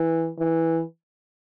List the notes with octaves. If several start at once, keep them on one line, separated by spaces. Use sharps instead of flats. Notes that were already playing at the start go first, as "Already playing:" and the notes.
Already playing: E3
E3